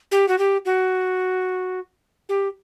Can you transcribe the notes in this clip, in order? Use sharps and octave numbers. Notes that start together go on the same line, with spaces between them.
G4
F#4
G4
F#4
G4